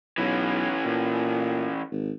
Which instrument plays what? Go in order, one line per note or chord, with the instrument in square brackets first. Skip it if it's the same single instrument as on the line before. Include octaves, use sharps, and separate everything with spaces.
[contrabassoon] B1 [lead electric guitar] E3 C#4
[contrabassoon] A#2
G#1